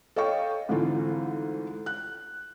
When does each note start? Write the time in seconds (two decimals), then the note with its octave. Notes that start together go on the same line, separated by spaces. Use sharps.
0.16 A4 C#5 D#5 F5 G5 C#6
0.69 G#2 D3 E3 A3 C4 F4
1.86 F#6